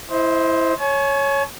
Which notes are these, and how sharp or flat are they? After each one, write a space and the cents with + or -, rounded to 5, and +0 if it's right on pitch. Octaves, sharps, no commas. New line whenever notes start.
E4 +0 C5 +0 D#5 +40
C#5 +0 G#5 +45